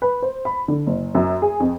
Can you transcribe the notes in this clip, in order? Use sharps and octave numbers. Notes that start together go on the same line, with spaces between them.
B4
C5
B5
D3
F#1
F#2
G#4
F2